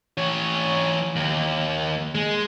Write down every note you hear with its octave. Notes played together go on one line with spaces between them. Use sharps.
E3 C#5
D#2
G#3